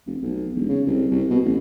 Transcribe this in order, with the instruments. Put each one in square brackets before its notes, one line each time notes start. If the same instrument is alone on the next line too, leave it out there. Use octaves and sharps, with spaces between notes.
[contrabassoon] F1
B1
E1
C#3
C2
C2
B2
A1